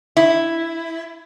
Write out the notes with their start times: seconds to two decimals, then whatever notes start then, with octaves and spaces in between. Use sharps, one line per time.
0.17 E4